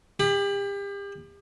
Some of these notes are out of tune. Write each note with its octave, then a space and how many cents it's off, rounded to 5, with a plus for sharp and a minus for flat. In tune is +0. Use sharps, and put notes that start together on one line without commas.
G4 +35 B5 +0